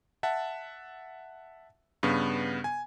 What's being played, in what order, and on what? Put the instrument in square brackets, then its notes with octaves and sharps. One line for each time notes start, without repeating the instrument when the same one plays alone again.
[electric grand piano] E5 F#5 A5
G2 C#3 B3
G#5